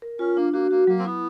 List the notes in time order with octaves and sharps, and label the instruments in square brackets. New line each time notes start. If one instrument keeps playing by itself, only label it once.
[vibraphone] A#4
[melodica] C#4 [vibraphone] F4
[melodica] A#3 [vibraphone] D4
[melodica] A#3 [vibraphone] F#4
[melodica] A#3 [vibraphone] F#4
[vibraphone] F#3 [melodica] A#3
[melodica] C4
[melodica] B3 [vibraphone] E4